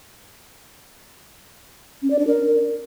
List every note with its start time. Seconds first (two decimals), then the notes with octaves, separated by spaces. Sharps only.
2.02 C#4
2.11 D5
2.19 D4
2.27 A#4